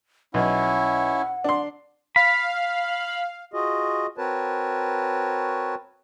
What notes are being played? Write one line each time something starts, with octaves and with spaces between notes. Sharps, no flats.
B1 C#4 E4 F#5
D4 C6
F5 B5
F4 F#4 G#4 D#5
C4 F#4 A#4 B4 C#5 A5